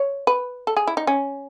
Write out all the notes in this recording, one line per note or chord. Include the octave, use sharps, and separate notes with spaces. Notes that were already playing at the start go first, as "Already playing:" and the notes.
Already playing: C#5
B4
A4
G#4
E4
D#4
C#4